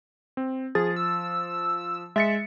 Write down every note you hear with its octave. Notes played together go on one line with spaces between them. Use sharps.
C4
F3 G#4 A6
E6
G#3 E5 A6 C#7